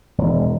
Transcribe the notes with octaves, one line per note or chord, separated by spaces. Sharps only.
E1